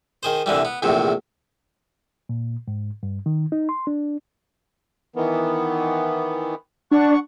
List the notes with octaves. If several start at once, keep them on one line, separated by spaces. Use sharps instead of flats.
D#3 G#4 C5
C2 D3 E3 G3
B3
A#1 E2 A2 C3
A#2
G#2
G2
D#3
D#4
C6
D4
D#3 E3 B3
D4 F#5 C#6